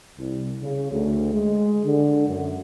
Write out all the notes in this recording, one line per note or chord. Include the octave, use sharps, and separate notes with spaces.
C2
C#3
D2
G#3
D3
F#2